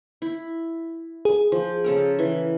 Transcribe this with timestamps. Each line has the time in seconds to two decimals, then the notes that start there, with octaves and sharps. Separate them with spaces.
0.22 E4
1.25 G#4
1.52 F3
1.84 C#3 A4 A#4
2.19 E3